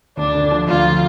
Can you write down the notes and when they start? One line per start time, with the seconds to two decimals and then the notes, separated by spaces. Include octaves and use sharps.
0.17 D2 D4
0.35 D3
0.51 F3
0.68 D2 F4
0.85 F3